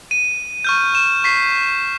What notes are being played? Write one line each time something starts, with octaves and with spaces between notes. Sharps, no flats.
D#7
C#6 F6 G6
E7
C#6 B6 C7